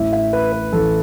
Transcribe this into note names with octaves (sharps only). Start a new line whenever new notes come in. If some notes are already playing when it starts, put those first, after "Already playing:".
Already playing: A1 A2 E3 E5
E5
B4
B4
A1 A2 E3 A4